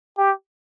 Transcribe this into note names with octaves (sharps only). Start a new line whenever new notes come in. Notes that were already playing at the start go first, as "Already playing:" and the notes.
G4